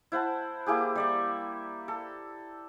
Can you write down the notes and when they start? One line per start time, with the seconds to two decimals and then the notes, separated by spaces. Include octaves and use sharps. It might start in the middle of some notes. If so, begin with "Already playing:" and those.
0.12 E4 C5 F#5 A5
0.66 A#3 E4 G4 G#4
0.95 G3 D5 E5
1.88 A4